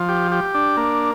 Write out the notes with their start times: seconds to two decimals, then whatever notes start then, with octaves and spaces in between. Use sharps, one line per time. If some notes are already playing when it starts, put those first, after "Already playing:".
Already playing: F3
0.09 G4
0.32 G4
0.55 D4
0.77 A#3